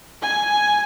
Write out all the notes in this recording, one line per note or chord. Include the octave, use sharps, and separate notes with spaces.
G#5